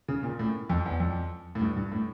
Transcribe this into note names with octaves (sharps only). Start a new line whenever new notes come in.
C#3
A#2
A2
F2
E2
F2
A2
G2
G2
A2